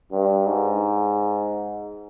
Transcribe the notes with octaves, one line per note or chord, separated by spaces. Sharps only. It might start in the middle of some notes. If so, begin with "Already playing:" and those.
G2
G#2